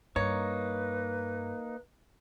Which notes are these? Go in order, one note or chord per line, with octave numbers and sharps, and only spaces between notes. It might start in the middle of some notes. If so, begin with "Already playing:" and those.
G2 A#3 D#4 B4 C#5